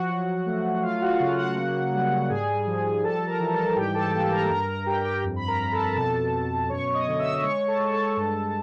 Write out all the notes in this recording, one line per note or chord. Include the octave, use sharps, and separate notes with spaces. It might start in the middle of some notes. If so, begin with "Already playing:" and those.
Already playing: F3 F#4 F#5
F#3
A3
F#3 F4 F5
F#4 F#5
C#3 F4 F5
F#4 F#5
A#3
G3
G#2 G#4 G#5
F3
G3 A4 A5
A#4 A#5
E3
A4 A5
G#2 G4 G5
A4 A5
A#3 A4 A5
A#4 A#5
G2 A#4 A#5
A#4 A#5
G2 G4 G5
G4 G5
F2
B5
A#4 A#5
F2
A4 A5
B2 A4 A5
B2
F#2 C#5 C#6
D#5 D#6
D3
E5 E6
G#3 C#5 C#6
A4 A5
G#3
A4 A5
G2